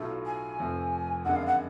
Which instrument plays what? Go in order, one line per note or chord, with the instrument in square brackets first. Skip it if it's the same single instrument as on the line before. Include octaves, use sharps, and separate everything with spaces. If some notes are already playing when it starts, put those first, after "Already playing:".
Already playing: [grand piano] B1 A2 F#3 A3 F4
[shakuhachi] G#5
[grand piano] F1 F2 F3 A3
[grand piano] F#1 F2 D3 G#3 [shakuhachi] F#5
[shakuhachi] F5
F#5